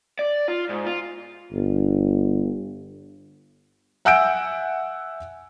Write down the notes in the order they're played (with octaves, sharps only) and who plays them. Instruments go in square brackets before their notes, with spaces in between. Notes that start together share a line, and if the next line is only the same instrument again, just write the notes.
[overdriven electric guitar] D5
F4
G#2
F4
[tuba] G1
[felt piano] E5 F#5 G#5 E6 G6 D7